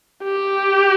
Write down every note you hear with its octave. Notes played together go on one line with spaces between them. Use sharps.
G4